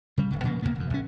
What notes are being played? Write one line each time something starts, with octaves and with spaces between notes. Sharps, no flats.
C#3 G3
D1 G1 C#3
A#2 C#3 F3 A#3
E2 G#2 A#3 B3
E1 F#2
A#1 C#4